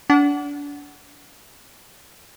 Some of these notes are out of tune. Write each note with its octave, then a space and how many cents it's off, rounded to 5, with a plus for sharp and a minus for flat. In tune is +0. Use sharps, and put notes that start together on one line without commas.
D4 -30 F#5 +10